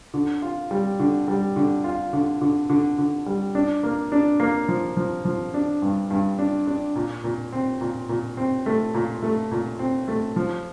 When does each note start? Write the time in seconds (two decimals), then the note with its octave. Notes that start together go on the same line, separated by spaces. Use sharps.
0.14 D3
0.42 F4
0.71 G3
1.00 D3
1.28 G3
1.56 D3
1.84 F4
2.13 D3
2.41 D3
2.69 D3
2.98 D3
3.26 G3
3.55 D4
3.83 A#3
4.12 D4
4.40 A#3
4.68 F3
4.97 F3
5.25 F3
5.54 D4
5.82 G2
6.11 G2
6.39 D4
6.67 D4
6.96 A#2
7.24 A#2
7.52 C4
7.81 A#2
8.09 A#2
8.37 C4
8.66 A3
8.94 A#2
9.23 A3
9.52 A#2
9.79 C4
10.08 A3
10.36 F3